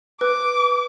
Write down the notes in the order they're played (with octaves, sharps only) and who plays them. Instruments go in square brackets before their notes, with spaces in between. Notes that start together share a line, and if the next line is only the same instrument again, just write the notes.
[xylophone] B4 [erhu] D6